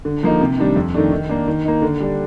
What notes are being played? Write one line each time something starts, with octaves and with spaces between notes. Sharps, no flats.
D3
F3 A#3 D#4
C3
D#3 G3 D4
F2
D#3 A3 D4
D#3
A#3 D4
D#3
A#3 D#4
D3
G3 D4